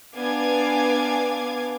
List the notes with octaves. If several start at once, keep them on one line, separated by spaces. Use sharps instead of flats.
B3 D4 F5 G#5 D6 G#6